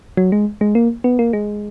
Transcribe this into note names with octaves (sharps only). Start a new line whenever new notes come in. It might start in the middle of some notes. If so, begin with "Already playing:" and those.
F#3
G#3
G#3
A#3
B3
A#3
G#3